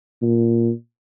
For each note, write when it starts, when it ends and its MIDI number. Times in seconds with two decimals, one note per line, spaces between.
0.22 0.71 46